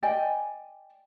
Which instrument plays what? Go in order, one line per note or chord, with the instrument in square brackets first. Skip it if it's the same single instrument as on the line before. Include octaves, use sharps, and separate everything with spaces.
[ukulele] D5 D#5 G5 G#5